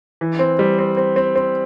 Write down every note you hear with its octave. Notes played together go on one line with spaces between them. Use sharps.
E3
C4
G3
C4
C4
C4
C4